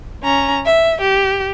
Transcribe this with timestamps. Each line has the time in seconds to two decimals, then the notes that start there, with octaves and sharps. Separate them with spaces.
0.24 C#4 A#5
0.66 E5
1.01 G4